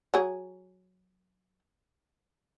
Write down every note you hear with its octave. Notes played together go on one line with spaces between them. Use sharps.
F#3 G#4